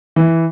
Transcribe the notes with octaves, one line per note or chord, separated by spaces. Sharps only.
E3